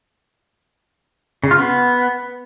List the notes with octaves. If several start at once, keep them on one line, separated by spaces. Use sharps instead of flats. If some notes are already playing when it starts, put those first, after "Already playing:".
C#3
F4
B3